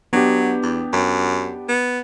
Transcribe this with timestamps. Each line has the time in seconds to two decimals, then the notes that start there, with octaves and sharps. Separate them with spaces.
0.13 F#3 B3 D4 G4
0.63 E2
0.93 F#2
1.68 B3